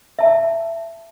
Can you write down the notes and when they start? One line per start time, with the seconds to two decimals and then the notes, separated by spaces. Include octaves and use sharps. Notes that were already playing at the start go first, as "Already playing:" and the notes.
0.19 E5 A5